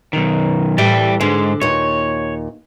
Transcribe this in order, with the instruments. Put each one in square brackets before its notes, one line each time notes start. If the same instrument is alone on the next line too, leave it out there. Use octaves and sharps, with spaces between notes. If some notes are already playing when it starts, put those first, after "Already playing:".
[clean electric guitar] B1 D#3
[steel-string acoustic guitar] A2 E3 G3 [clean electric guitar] D5 E5 G5
[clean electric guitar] G#2 G#3 [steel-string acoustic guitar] D3
[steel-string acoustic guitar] D#2 A#2 [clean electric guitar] C#5